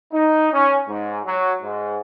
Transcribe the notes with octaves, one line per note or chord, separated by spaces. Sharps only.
D#4
C#4
G#2
F#3
G#2